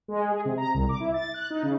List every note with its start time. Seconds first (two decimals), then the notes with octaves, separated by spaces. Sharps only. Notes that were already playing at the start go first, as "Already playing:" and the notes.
0.08 G#3
0.32 G#4
0.45 C3
0.58 A#5
0.74 C2
0.89 D6
1.00 E4
1.14 A6
1.34 F#6
1.50 D#4
1.63 C#3